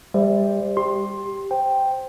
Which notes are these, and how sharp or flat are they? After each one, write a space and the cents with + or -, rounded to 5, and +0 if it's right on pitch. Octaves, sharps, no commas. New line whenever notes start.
G3 +25 C5 +0 E5 +0
G4 +0 C6 +15
C5 +0 G5 +0